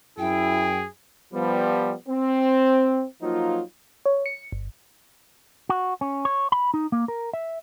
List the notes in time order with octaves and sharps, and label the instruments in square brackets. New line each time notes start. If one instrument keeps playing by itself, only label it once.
[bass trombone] F#2 [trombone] E4 [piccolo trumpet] G#4 [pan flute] G5
[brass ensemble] F3 G3 B3
C4
F3 F#3 A#3 D#4 F4
[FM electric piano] C#5
C#7
G1
[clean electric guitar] F#4
C#4
C#5
B5
D#4
A#3
A#4
E5